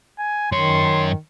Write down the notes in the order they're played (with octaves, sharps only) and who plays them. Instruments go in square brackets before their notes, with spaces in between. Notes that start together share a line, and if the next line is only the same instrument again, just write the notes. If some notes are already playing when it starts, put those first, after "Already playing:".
[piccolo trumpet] G#5
[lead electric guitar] F#2 C#5 [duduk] D#3 [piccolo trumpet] C6